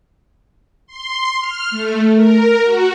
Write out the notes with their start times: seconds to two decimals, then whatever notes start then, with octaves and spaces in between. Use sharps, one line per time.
0.87 C6
1.40 F6
1.71 A3
2.14 A#4
2.62 F#4